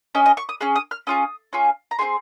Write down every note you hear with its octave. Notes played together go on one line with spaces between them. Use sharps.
C#4 G#4 D#5
D#5
C#6
D#6
C#4 G#4 F6
D#6
F6
C#4 F4 G#4 D#6
C#4 F4 G#4
A#5
C4 F4 G#4 C6